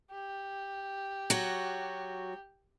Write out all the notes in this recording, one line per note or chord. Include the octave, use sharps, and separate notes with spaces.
G4
F#3 F#4